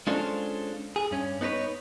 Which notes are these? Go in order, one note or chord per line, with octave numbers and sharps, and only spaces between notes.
G#3 C#4 D4 F4 A4 C5
G#4
G2 C#4
B3 D#4 A4 B4 C#5